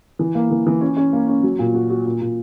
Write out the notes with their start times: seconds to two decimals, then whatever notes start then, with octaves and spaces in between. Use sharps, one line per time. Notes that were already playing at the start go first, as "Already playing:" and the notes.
0.19 E3
0.35 A#3
0.51 E3
0.67 E3
0.81 C#4
0.97 C#4
1.13 A#3
1.28 C#4
1.43 F#3
1.59 A#2
1.74 F#4
1.90 F#4
2.05 A#2
2.21 A#2